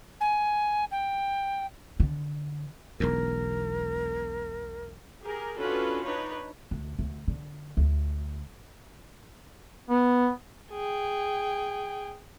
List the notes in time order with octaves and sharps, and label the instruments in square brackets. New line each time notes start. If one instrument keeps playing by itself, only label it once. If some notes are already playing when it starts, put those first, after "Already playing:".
[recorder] G#5
G5
[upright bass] D3
[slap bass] E1 B1 E2 [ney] A#4
[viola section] G4 G#4 A#4
C#4 D4 F4 F#4 A4 B4
D4 D#4 B4 C#5
[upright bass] D2
D2
D3
D2
[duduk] B3
[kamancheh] G#4 G5